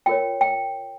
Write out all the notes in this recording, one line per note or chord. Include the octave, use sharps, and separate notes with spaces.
F4 A#4 C#5 G5
G5